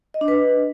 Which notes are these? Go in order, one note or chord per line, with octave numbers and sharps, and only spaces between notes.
D#5
D4
B4